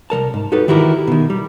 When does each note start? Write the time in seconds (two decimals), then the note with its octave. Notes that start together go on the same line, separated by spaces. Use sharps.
0.10 C2 F#3 A#4 A5
0.34 G#2
0.52 D#4 F#4 G4 A4 B4
0.68 D#3 E3 E4 F#4 G4 A#4
1.08 B2 D#3
1.30 G3